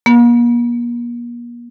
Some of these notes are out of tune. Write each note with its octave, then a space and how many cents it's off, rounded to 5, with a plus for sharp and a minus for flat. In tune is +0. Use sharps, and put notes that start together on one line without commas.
A#3 +40